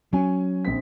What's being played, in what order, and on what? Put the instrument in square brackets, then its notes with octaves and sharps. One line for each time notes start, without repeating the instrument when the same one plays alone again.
[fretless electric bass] F#3 [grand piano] C#4 G#5
[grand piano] A#1 C4 B6